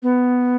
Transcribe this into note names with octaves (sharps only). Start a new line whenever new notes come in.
B3